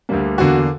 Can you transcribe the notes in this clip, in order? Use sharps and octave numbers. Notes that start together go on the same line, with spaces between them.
D2 D3 G3 A#3
E2 D3 A#3 F#4